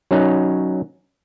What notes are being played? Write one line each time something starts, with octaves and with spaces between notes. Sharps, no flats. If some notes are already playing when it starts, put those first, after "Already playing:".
F#3 C#4 D#4